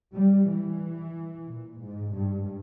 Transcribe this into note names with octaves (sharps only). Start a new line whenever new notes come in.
G3
E3
A#2
G#2
G2